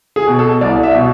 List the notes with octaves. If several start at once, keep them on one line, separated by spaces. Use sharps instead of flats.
G#4
B2
A4
C2 D5
E5
B2